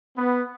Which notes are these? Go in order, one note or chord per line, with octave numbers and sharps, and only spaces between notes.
B3